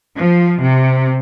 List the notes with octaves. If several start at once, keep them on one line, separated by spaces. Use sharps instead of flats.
F3
C3